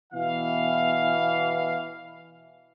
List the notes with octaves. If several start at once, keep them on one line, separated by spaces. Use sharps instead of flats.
B2 E3 F5